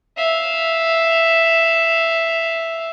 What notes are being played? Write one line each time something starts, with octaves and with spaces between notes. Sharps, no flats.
E5 F5